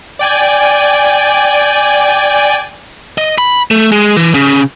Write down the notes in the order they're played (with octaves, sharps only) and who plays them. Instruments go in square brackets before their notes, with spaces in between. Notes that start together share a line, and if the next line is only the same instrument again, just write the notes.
[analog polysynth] D5 G5 G#5
[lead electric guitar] D#5
B5
A3
G#3
E3
C#3